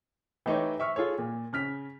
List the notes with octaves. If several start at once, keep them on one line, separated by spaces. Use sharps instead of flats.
E3 A3 D#4 G4 A4 C#5
E5 C#6 F6
F4 G#4 A4 C#5
A#2
C#3 F6 B6